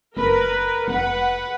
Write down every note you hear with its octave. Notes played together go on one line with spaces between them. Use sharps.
F#1 A#4 B4
F1 B4 F#5